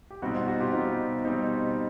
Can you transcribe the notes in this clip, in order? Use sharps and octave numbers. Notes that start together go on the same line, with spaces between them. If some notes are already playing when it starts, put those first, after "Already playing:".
G4
B2 G3 C4 D#4 F#4
F4
F#4
F4 G4
B2 G3 C4 D#4
B2 G3 C4 D#4